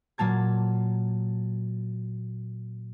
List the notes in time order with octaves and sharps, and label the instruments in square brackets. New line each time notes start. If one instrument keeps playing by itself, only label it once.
[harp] A#2 F#3 A#3 A5 G#6